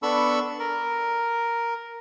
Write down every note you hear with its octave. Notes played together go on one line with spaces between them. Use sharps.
B3 D4 A4 B5 C#6 E6
A#4